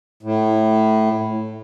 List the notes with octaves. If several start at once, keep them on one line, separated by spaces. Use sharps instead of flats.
A2